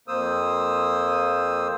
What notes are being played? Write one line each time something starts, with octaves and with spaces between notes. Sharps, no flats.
F2 A#3 C5 D#6 E6